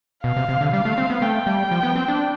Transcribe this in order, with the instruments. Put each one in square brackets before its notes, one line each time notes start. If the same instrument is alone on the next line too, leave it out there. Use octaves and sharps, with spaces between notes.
[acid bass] B2 [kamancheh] F5
[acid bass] C3
C3
D3
[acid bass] G3 [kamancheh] F5
[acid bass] A3
C4
B3
[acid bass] A3 [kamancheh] G5
[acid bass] G3
F3
B3
C4
D4